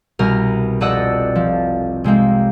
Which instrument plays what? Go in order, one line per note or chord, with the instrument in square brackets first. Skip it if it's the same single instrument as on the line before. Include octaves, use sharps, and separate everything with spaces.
[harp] C2 B2 A#4 F6
F1 A4 D5 D#5 F#5 E6
F3
C3 G#3 A#3 C4